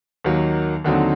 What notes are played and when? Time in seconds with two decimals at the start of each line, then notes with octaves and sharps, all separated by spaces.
0.24 D#2 D#3 F#3 A#3
0.84 D#2 D3 F#3 C4 D#4